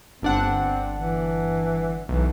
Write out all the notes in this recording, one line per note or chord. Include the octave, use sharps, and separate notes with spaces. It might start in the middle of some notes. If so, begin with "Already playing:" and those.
G1 C4 D4 F#5
E3
B1 E3